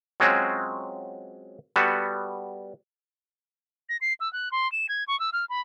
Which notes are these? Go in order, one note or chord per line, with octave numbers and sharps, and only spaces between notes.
F#3 G#3 C4 C#4 F4 F#4
G3 B3 F#4 A4
A#6
C7
E6
F#6
C6
E7
G#6
C#6
E6
F6
B5